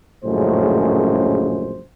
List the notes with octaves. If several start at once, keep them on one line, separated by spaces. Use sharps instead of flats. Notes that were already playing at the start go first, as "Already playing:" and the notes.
A#1 F#2 A2 C#3 G#3 C5